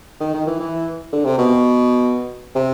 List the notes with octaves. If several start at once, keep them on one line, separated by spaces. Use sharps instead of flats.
D#3
D#3
E3
E3
D3
C3
B2
C3